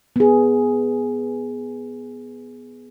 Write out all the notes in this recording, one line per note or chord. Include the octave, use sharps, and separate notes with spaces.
B3 G#4